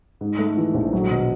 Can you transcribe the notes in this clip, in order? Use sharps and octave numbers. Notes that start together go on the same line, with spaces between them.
G#2
A3
E3
A#1
F#3
B2